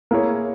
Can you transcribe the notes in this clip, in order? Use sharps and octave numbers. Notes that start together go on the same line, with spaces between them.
A#3 E4 G#4 C#5